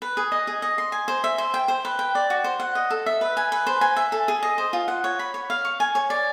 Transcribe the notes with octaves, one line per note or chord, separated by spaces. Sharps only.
B4
G#4
D#5
G#4
D#5
C6
G#5
C5
E5
C5
G5
C5
B4
G5
D5
F#4
C5
F#5
D#5
A4
E5
B4
G#5
B4
C5
G#5
E5
A4
G#4
D#5
C5
F4
F#5
C#5
B5
C#5
F5
C#6
G#5
C#5
D5